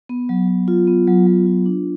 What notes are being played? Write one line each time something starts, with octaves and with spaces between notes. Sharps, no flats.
B3
F#3
F#3
F4
B3
F#3
F#3
F4
D4